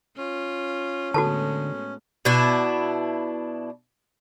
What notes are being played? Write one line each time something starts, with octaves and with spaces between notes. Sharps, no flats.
C#4 F4
A2 D3 G#3 B3 F#4 A4 A5
B2 D4 E4